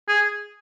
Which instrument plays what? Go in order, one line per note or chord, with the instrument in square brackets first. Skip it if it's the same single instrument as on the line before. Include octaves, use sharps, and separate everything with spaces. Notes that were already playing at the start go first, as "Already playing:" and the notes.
[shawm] G#4